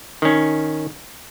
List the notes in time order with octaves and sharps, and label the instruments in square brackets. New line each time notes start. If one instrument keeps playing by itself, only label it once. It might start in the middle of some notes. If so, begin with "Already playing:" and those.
[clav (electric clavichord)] D#3 C#4